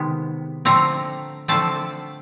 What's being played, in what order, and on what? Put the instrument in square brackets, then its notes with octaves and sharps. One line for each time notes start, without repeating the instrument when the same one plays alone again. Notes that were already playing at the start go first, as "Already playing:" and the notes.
Already playing: [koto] C3 D#3 G#3 B3
D3 F3 A3 C4 A#5
D3 F3 A3 C4 A5